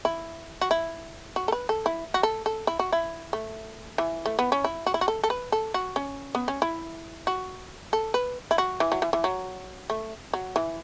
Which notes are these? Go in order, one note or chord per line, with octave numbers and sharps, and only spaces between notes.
E4
F#4
E4
F#4
A4
B4
A4
E4
F#4
A4
A4
E4
F#4
E4
A3
E3
A3
B3
C#4
E4
F#4
E4
F#4
A4
A4
B4
A4
F#4
C#4
B3
C#4
E4
F#4
A4
B4
E4
F#4
E3
F#3
E3
E3
F#3
A3
F#3
E3